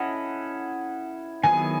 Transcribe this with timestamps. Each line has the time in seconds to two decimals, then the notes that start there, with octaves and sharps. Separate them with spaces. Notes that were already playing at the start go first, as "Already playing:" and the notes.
Already playing: C#4 E4 A4 D#5 F#5
1.43 D#3 F#3 B3 E4 G#4 G#5